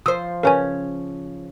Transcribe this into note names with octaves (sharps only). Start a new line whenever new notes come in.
F3 C5 D#6 E6
C#3 C#4 A#4 B4 G#5